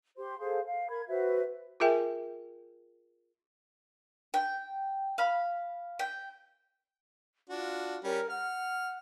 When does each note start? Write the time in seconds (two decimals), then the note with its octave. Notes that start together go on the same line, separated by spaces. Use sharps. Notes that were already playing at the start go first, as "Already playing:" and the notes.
0.17 G4 C5 C6
0.40 G#4 A4 C5 F5
0.65 F5
0.89 A#4 B5 G#6
1.08 F#4 B4 C5 E5
1.80 F4 G#4 A#4 E5 G5 G#5
4.34 G5
5.18 F5 B5
5.99 G5
7.50 D4 F4 F#4
8.04 G3 C#4 A#4
8.30 F#5 F6